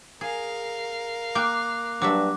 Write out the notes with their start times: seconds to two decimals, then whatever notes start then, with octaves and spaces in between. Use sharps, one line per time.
0.21 G#4 A#4 F5
1.35 A#3 G5 D6 F#6
2.02 G2 F#3 D4 E5 D6